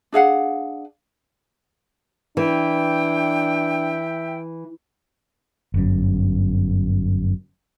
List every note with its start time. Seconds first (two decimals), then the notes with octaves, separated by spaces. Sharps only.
0.12 D4 G#4 F5 F#5
2.37 E3 D4 E5 G5
5.74 G1 F#2